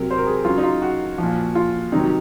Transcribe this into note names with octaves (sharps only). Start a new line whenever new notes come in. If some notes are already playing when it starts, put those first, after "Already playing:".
Already playing: C3 F#3 A#4
C5
A#4
G#4
C#3 F#3 F4
D#4
F4
F#4
A#2 F3
F4
C3 D#3 F#3 D#4